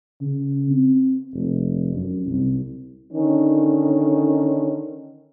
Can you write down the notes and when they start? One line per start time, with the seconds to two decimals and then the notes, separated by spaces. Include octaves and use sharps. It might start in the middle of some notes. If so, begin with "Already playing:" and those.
0.21 C#3
0.70 C4
1.34 F1
1.95 F#2
2.26 C2
3.12 D3 D#3 C#4 D#4